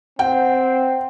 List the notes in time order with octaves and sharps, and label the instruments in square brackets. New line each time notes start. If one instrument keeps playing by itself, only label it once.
[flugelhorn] C4 [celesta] F#5 [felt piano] G5